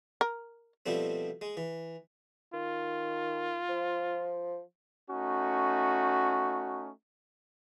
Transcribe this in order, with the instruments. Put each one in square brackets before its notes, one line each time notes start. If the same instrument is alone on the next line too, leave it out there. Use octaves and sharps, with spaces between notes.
[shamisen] A#4
[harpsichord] B2 F3 G3 A3 C4
G#3
E3
[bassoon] D#3 [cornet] F4
[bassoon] F3
[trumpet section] A3 C#4 D#4 F#4